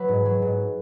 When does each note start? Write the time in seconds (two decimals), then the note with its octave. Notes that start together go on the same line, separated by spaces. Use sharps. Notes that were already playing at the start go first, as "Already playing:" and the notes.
Already playing: F#3 B4
0.08 G#2
0.25 F#3
0.42 G#2